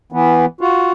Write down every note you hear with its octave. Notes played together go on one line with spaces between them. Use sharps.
E3 B3
F4 F#4